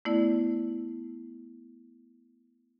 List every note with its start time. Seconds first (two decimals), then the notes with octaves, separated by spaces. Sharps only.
0.05 A3 B3 E4 D5